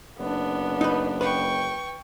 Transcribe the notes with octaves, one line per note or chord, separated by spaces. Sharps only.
F#1 B3 D4
D#4 B4
B4 G5 C#6